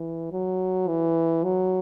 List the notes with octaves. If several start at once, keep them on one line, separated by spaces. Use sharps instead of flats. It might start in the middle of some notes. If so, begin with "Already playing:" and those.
Already playing: E3
F#3
E3
F#3